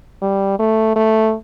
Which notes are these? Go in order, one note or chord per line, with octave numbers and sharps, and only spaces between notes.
G3
A3
A3